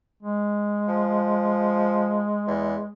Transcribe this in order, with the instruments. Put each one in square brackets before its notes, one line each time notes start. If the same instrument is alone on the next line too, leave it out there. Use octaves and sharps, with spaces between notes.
[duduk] G#3
[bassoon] F3
E2